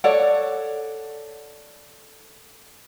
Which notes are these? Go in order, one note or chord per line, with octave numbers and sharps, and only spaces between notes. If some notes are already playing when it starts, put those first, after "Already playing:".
A4 C#5 D5 F#5